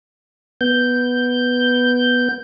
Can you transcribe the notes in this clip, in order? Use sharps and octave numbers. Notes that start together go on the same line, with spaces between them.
B3 G6